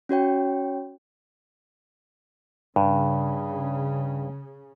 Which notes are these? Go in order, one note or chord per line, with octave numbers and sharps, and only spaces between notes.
C#4 F#4 C#5 G5
G2 C#3